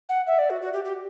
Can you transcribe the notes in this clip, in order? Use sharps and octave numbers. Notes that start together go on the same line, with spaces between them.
F#5
E5
D5
F#4
F#4
G4
G4